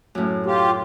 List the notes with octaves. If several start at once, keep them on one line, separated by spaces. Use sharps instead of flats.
F#2 A2
F4 G4